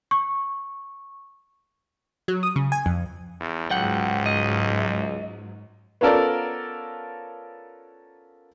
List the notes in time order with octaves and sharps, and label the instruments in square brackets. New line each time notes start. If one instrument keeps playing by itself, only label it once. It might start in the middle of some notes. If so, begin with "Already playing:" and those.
[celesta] C#6
[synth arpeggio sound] F#3
D#6
C#3
G#5
F2
[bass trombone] E2
[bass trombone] C#2 [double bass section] G#2 F#3 [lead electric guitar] F#5 G5
[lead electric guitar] D#5
[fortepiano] B3 C#4 F4 A4 A#4 D5